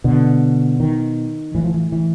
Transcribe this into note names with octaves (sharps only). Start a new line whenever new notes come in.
B2 D3
D#3
A2 E3
F3
E3
E3